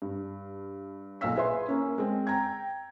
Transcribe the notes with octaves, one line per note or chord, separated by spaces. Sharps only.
G2
B1 A#2 F5 E6 B6
E4 G#4 B4 E5 C6
A#3 C#4
G#3 C4
G5 A#5 G#6